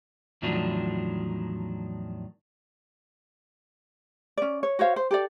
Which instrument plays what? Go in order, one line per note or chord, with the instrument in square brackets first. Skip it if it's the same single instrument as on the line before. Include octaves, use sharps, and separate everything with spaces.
[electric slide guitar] E2 A2 D#3 F3 F#3 D4
[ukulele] C#4 D5
C#5
F#4 C5 C#5 F5
C5
G4 A4 D5